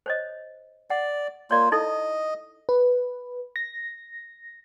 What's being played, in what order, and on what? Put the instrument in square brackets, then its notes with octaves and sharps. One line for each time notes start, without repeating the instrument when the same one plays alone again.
[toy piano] C5 C#5 D#5
[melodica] D5 [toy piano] F#5
[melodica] A#3 F4 [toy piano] C#5 D5
[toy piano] D#4 E4 A4 [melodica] D#5
[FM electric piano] B4
A#6